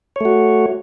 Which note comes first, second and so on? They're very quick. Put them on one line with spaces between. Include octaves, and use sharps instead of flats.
C#5 A3 F#4